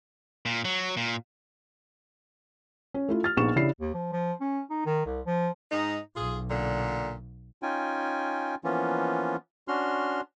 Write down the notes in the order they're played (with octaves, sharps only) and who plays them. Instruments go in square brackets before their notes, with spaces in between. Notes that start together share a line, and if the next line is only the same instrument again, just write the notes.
[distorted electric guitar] A#2
F#3
A#2
[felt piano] C#4
A3 E4 F4
F6 A6
A#1 B3 D#4 G#4 C#6 E7
C#3 D4 E4 G4 C7
[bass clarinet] D#2
F3
F3
C#4
D#4
D#3
C2
F3
[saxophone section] G#2 D#4
[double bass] B1 [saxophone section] F4 G#4
[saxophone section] A#2 D3
[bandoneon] C#4 D#4 F4 G5 G#5
E3 F3 A#3 B3 C#4 F4
C#4 D4 F#4 C6 F6